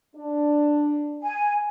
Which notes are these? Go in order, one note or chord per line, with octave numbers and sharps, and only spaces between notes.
D4
G#5